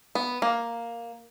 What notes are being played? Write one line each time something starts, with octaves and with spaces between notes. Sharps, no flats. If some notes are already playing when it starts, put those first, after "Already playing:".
B3
A#3